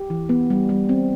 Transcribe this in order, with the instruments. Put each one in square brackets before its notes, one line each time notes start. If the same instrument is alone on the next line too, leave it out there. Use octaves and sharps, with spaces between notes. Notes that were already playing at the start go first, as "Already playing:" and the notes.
Already playing: [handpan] G4
E3
B3
G3
G3
C4